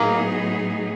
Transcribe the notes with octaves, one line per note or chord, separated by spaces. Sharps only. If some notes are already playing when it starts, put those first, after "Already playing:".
Already playing: A2 F#3 A#3 B3 D#4 G#4